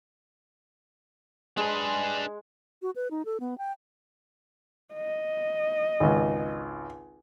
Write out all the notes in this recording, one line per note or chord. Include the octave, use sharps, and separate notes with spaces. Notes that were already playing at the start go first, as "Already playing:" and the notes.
G#3 D4 B4
F#4
B4
D#4
A4
B3
G5
D#5
G#1 C#2